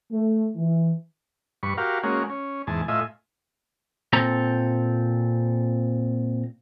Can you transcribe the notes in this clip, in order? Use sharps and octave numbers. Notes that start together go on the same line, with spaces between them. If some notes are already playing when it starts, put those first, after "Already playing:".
A3
E3
G2 B4 C#6
F#4 G4 A#4 F5
G#3 A#3 C#4 F#4
C#4
E2 G#2 G#5 A5
A2 F4 D#5 E5 G#5
A#2 C4 A4 A#5